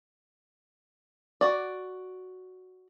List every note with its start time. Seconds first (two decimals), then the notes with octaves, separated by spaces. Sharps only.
1.41 F#4 D5